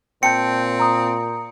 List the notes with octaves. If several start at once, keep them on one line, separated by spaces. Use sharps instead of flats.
A#2 C4 G5 A5 G6 C#7
A#5 D#6